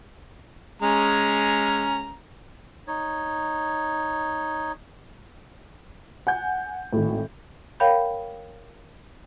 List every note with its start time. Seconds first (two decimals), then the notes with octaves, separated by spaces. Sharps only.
0.82 G#3 C#4 A#5
2.87 D#4 C#5
6.27 F#5 G#5 G6
6.93 G#1 A2
7.80 A#4 C#5 F5 G5 B5 G6